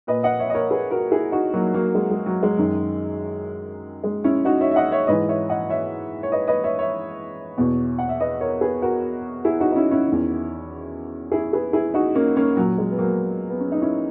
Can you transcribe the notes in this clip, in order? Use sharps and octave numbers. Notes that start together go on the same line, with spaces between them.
A#2 B4 D#5
D#5 F#5
C#5 E5
D#5
A#4 C#5
G#4 B4
F#4 A#4
E4 G#4
D#4 F#4
F#3 A#3
F#3 A#3
G#3
G#3
F#3
G#3
F#2 D#3
G#3
C#4 E4
D#4 F#4
C#5 E5
E5
D#5 F#5
C#5 E5
G#2 E3 B4 D#5
C#5 E5
D#5 F#5
C#5 E5
C#5
B4 D#5
B4 D#5
C#5 E5
C#5 E5
E2 B2
F#5
E5
B4 D#5
A#4 C#5
G#4 B4
F#4 A#4
E4 G#4
D#4 F#4
D#4
C#4 E4
C#4 E4
D#3
E2
E4 G#4
G#4 B4
E4 G#4
D#4 F#4
A#3 C#4
A#3 C#4
A#2 F#3
G#3
B3
F#3 A#3
B3
C#4
D#4
C#4 E4